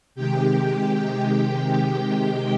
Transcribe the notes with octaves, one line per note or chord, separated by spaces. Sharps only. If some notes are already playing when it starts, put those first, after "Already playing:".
C3 D#3 G#3 G4 G5